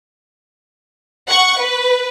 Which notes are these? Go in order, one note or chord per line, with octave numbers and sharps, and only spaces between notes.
F#5 C#6
B4